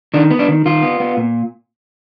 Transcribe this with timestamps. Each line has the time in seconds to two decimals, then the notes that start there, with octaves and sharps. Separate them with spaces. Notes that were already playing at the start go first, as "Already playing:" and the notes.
0.14 D#3 D4
0.31 B3
0.39 D4
0.48 D#3
0.66 D#3 F4
0.82 B3
1.00 B3
1.17 A#2